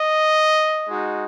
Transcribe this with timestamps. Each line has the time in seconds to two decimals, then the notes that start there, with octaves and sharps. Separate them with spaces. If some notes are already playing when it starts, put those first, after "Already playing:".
Already playing: D#5
0.88 G#3 D#4 F#4